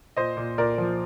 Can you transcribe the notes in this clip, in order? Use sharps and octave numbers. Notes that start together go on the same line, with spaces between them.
A#2 C5 D#5
A#2
A#2 A#4 D5
F3